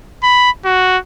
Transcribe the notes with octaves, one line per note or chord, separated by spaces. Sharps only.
B5
F#4